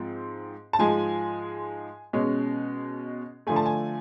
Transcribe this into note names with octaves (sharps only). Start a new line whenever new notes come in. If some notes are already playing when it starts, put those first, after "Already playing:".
Already playing: G#2 F3 C4
A5
G#2 F3 G#3 G#5
B2 G#3 C#4
D3 F3 A3 G#5
A5
G#5